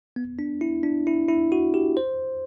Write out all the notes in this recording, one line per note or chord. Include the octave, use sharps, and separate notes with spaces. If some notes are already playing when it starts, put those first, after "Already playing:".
B3
D4
E4
D4
E4
E4
F#4
G4
C5